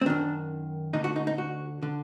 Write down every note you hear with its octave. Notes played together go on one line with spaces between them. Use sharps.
C4
F#2 D#3 D4
D2 D3 D#4
F#4
D#4
D#4
F#4
D3